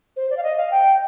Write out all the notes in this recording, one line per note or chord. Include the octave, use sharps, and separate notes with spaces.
C5
D5
F5
D#5
F5
G5